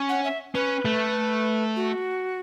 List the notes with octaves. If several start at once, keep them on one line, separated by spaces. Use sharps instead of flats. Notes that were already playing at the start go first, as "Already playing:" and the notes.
Already playing: C#4
F#5
E5
C#4 B4
A3
F#4